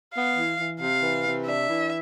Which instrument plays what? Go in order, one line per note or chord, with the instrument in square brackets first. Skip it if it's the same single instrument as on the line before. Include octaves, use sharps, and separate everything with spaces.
[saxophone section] B3 [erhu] F5
[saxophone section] E3
E3
[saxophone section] C3 [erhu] F5
[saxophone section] E3
C3
[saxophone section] D4 [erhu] E5
[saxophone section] E3